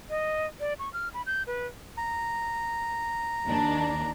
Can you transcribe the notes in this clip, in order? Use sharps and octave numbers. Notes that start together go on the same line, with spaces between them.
D#5
D5
C#6
F6
B5
G6
B4
A#5
D#2 D#3 D4